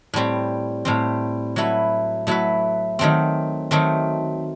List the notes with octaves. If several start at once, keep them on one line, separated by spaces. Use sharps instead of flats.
A2 G3 C4
A2 G3 C4
F#3 A3 E4 B4
F#3 A3 E4 B4
D#3 F#3 A3 C4
D#3 F#3 A3 C4